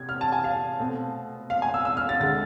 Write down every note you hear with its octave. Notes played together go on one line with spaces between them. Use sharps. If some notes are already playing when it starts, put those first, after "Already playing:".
Already playing: C3 G#6
F6
A5
G#5
F5
B2 A3 C4
F5
G#5
E6
E6
F6
A6
D2 D3 G#3 A6